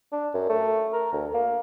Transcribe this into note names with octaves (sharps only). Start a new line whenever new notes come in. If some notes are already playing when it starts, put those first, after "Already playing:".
D4
F#2
A3
A#4
D2
A#3